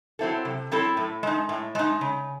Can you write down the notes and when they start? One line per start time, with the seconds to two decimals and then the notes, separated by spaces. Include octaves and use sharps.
0.19 F#3 C4 E4 A4
0.45 C3
0.71 F#3 C4 E4 A4
0.97 A2
1.23 G#3 D#4
1.49 A2
1.75 G#3 D#4
2.01 C#3